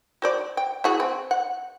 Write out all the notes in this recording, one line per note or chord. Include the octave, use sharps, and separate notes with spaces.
F#4 C5 D5
G5
E4 F#4 G#4
C4
F#5